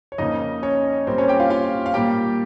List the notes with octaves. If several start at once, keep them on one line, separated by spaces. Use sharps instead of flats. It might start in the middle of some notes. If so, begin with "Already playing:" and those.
C#5
F2 C#3 F3 A#3 D#4 D#5
C#4 C#5
A#2 G3 A#3 C4 C5
C#4 C#5
G4 G5
F4 F5
F4 F5
F5
A#2 G3 A#3 G4 G5